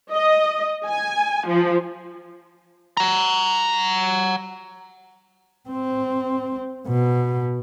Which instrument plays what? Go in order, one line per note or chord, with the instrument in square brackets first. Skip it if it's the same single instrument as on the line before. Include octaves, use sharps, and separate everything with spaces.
[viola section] D#5
G#5
F3
[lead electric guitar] F#5 A#5
[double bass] C4
B2